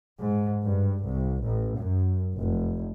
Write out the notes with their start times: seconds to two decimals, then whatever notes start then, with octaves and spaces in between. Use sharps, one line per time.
0.21 G#2
0.66 G2
1.05 C2
1.46 A1
1.79 F#2
2.37 F1